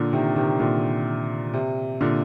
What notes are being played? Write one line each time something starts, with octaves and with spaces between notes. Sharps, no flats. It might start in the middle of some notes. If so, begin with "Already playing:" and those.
Already playing: A#2 D3
C3 D#3
C3 D#3
A#2 D3
C3
A#2 D3